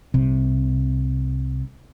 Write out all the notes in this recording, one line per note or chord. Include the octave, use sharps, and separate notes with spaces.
C2 C3